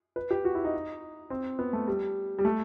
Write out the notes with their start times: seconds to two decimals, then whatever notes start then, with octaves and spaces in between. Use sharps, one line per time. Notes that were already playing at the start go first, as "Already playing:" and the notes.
0.16 B4
0.31 G4
0.45 F#4
0.55 E4
0.64 D#4
1.30 C4
1.59 B3
1.73 A3
1.88 G3
2.39 G3
2.45 A3